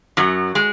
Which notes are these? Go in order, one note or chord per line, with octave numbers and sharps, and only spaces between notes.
F#2 F#3
G#3